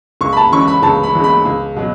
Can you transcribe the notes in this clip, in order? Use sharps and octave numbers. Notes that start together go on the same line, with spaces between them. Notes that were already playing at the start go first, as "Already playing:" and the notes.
C#2 C#6
B5
A5
C#3 E3 G#3 C#4 C#6
B5
C#2 A5
B5
C#3 E3 G#3 C#4
B5
C#2
B2 F#3